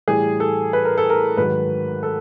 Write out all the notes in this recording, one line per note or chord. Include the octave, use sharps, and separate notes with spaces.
A2 E3 G3 G#4
A4
B4
A#4
A4
A#4
G#2 D#3 F#3 B4
A4